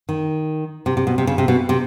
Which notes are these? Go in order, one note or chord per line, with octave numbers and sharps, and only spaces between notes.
D#3
C3
C3
B2
C3
C#3
C3
B2
C3